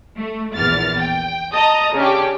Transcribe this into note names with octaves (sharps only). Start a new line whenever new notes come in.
A3
A#1 E2 F6 A6
G5
D#5 A5 A#5 D#6
C#3 C#4 D4 G4